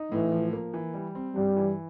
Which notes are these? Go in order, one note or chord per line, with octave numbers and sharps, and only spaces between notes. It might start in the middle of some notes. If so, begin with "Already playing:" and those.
Already playing: D#4
A2 E3
F3
A#3
E3
G3
C4
G2 G3
E3